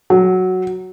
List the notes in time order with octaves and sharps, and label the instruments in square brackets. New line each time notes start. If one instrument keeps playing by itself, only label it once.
[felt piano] F#3